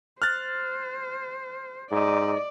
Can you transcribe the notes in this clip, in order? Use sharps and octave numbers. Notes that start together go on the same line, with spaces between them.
C5 F6 F#6 A6
G#2 D5 D#5